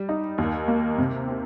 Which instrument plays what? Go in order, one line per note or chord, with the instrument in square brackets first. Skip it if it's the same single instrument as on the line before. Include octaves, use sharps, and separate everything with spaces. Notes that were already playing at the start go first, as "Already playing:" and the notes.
Already playing: [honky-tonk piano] G3
D#4
D#2
A#3
C3
C4